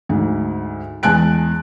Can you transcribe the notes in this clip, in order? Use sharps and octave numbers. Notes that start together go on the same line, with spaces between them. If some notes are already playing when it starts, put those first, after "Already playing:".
D2 G#2
E2 G#3 G#5 A5 F#6 D7